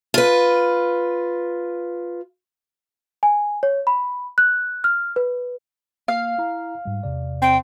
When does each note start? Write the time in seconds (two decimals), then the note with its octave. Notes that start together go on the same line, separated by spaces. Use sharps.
0.14 F4 B4
3.23 G#5
3.63 C#5
3.87 B5
4.38 F#6
4.84 F6
5.16 B4
6.08 A#3 F5
6.38 E4 A#5
6.85 G#2 G3
7.03 E2 C3 D5
7.42 C4 G5